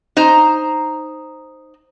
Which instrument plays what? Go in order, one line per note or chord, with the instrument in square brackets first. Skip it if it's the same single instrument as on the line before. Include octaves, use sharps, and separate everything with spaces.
[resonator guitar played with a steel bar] D#4 C5 A#5